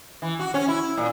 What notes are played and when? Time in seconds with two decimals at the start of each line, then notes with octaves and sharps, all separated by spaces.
0.22 E3
0.39 F#4
0.54 C#4
0.68 E4
0.97 A#2